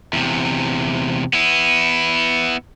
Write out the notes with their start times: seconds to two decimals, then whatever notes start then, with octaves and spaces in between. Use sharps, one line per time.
0.13 E2 C3
1.33 B3 E4